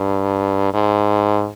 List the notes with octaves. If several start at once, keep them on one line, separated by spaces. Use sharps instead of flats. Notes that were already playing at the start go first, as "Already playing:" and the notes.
Already playing: G2
G#2